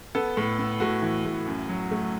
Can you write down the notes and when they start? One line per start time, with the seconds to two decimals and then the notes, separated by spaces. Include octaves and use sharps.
0.15 B3 A4
0.37 A2
0.59 B3
0.80 A2 F#4
1.02 E3
1.25 A2
1.46 F#2
1.69 F#3
1.91 A3